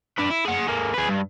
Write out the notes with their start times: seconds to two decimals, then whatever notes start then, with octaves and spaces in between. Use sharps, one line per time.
0.18 D4 B4
0.30 E4
0.45 G#4 F#5
0.67 G#3 A#3
0.94 G#4 B4
1.09 G2